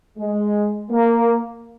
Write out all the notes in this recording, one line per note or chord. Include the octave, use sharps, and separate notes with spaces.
G#3
A#3